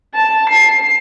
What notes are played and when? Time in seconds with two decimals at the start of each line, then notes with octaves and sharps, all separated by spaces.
0.14 A5
0.50 C7